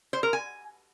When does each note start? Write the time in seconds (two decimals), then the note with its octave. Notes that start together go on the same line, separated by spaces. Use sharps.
0.13 C5
0.23 A#4
0.33 G#5